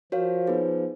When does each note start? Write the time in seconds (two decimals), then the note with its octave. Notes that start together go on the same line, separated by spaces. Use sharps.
0.12 F3 F#4 A#4 C#5 F5
0.47 B3 D#4 G#4 B4